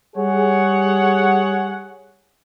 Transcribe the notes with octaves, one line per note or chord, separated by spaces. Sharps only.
G3 G#4 C#5 F#5